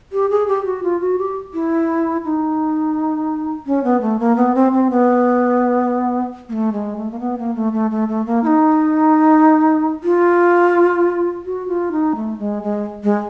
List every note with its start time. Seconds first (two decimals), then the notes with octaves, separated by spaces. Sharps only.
0.13 G4
0.30 G#4
0.48 G4
0.65 F#4
0.83 F4
1.01 F#4
1.19 G4
1.54 E4
2.25 D#4
3.67 C#4
3.84 B3
4.01 A3
4.20 A#3
4.37 B3
4.55 C4
4.72 C4
4.90 B3
6.49 A#3
6.53 A3
6.73 G#3
6.97 A3
7.11 A#3
7.20 B3
7.38 A#3
7.55 A3
7.73 A3
7.91 A3
8.08 A3
8.26 A#3
8.44 E4
8.47 D#4
10.03 F4
11.45 F#4
11.68 F4
11.92 D#4
12.16 A3
12.39 G#3
12.63 G#3
13.04 G#3